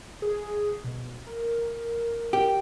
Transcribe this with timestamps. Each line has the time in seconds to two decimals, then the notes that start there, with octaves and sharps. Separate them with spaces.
0.22 G#4
0.84 B2
1.27 A#4
2.33 G4